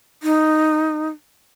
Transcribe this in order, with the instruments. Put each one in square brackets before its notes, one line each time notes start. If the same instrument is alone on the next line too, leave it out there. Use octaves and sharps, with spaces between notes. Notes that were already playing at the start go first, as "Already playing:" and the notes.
[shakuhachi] D#4